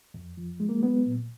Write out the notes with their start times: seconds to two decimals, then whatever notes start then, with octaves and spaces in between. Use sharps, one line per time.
0.14 F2
0.37 F3
0.60 G#3
0.69 A#3
0.83 F#3 B3
1.06 A#2